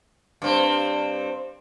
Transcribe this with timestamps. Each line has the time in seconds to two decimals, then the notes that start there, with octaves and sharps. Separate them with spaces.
0.42 G2 C4